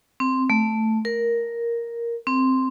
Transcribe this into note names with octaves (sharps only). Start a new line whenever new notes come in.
C4
A3
A#4
C4